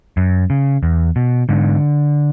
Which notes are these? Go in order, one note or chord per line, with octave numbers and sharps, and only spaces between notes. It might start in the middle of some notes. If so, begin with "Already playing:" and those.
F#2
C#3
E2
B2
G#2 D3